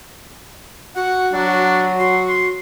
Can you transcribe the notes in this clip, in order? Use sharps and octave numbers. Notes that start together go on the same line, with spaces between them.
F#4 F#5
F#3 D4
F#4 C6
C6